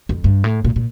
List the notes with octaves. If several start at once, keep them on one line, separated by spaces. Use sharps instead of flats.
F2
G2
A2
A#2
A#2